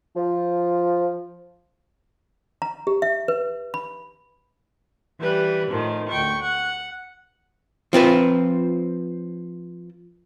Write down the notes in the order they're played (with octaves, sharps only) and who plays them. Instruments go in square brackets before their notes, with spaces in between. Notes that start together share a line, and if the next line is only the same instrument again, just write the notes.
[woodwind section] F3
[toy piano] A#5
G4
E5
B4
B5
[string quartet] E3 G3 B4
A2 D#3 F3
D2 G5 C#6
F#5
[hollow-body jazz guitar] F3 C4 F4 B4